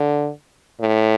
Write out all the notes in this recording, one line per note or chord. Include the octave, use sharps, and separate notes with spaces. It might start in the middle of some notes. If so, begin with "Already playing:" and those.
Already playing: D3
A2